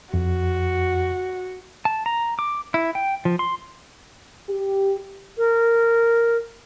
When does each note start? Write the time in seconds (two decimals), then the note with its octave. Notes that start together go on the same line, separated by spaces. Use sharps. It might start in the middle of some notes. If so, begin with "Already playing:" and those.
0.14 F2 F#4
1.85 A5
2.06 A#5
2.39 D6
2.74 E4
2.95 G5
3.25 F3
3.39 C6
4.49 G4
5.37 A#4